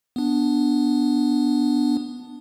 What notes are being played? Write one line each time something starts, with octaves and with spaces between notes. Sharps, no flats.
B3 D4